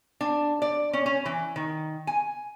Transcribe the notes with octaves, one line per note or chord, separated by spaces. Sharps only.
D4
D5
C#4
C#4
E3
D#3
G#5